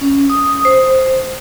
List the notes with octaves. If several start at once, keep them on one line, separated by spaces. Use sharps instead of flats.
C#4
D#6
C5